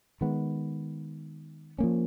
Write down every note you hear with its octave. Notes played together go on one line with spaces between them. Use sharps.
D#3 G#3 B3
F3 A#3 C#4